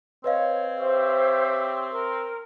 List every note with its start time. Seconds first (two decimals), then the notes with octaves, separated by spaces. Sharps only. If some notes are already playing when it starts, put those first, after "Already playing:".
0.24 C4 B4 C#5 D#5 F5
0.78 G4 C5 C#5 E5
1.91 A#4